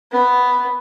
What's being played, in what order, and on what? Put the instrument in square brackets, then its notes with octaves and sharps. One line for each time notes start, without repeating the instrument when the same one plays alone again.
[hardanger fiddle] B3